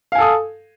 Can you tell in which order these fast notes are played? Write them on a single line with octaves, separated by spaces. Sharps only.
F5 G#5 A4 D#6